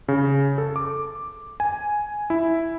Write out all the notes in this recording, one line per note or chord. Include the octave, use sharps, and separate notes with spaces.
C#3
A4
D6
G#5
E4